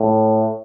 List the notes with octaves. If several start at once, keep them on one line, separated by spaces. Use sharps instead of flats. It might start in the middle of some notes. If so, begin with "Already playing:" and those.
Already playing: A2